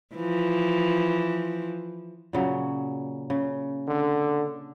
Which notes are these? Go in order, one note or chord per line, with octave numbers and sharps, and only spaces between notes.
E3 F3
A#2 C#3 F#3
C#3
D3